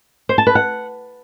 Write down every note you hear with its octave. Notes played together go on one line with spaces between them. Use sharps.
C5
A5
B4
F#5